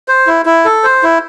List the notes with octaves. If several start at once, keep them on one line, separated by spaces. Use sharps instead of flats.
C5
E4
E4
A4
C5
E4